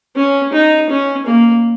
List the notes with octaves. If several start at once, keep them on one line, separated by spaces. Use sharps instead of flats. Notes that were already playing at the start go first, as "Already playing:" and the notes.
C#4
D#4
C#4
A#3